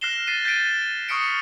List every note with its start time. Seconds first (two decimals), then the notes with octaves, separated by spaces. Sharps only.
0.01 F6 F#6 A#6 C7 E7 G7
0.27 F6 A6 B6 C7 D#7
0.45 G6 A6 B6 D7 D#7
1.09 C#6 D#6 F6 B6 C#7 D7